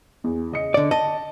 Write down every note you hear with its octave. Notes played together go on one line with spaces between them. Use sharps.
E2
C#3 D#5 C#7
D3 D5
D#5 A5